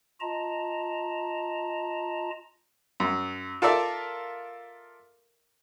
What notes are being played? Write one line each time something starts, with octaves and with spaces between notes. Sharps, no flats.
F4 D#5 A5 A#5
F#2
F4 A4 A#4 D5 E5